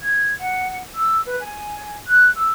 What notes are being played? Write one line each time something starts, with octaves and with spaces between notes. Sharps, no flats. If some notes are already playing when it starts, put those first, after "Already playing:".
G#6
F#5
E6
B4
G#5
F#6
E6